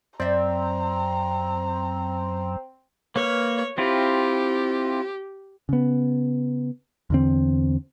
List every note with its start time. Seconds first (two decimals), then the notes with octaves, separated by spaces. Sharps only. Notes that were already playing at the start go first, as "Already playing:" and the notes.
0.20 F#2 C4 D5 E5 A#5
3.16 A#3 B4 C#5 F6
3.78 C4 E4 F4 G4
5.69 C#3 B3
7.10 E2 D3 C4